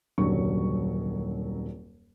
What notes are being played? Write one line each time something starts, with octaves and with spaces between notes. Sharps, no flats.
D#1 C2 F#2 D3 F#3 C#6